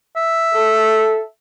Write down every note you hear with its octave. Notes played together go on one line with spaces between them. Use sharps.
E5
A4